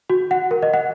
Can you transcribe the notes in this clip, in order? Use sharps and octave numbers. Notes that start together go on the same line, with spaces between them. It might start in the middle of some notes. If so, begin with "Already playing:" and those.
F#4
F#5
A#4
D#5
F#5